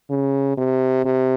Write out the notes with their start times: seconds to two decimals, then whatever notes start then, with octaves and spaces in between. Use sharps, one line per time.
0.10 C#3
0.58 C3
1.05 C3